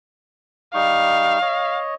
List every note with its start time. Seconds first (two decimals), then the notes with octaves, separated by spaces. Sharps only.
0.74 G3 D#4 F5 C#6
1.42 C#5 D#5